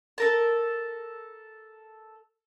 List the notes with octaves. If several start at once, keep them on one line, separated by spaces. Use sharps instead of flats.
A4 A#4 A5